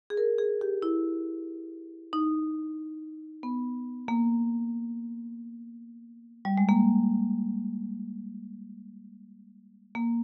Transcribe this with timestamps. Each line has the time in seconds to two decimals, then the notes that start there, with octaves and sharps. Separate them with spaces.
0.10 G#4
0.17 A#4
0.38 G#4
0.61 G4
0.82 E4
2.13 D#4
3.43 B3
4.08 A#3
6.45 G3
6.58 G#3
6.69 A#3
9.95 A#3